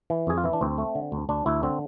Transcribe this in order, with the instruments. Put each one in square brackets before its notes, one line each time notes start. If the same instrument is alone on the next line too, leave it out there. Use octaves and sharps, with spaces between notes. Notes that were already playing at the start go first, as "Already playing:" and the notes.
[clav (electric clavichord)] E3
F2 G#4
F4
E3 E4
D4
D2 C4
A3
D3
D2
D2 D4
D2 E4
D3 C4